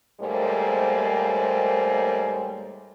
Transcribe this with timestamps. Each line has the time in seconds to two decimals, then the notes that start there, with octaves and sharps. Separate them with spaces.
0.20 D#2 G#2 G3 A3 A#3 C5